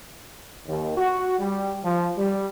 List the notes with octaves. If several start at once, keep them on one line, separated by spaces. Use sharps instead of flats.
D#2
F#4
G3
F3
G3